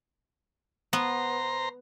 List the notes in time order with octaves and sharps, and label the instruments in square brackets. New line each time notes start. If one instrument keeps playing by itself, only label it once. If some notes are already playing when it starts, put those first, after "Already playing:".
[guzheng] B3 [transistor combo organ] C5 A#5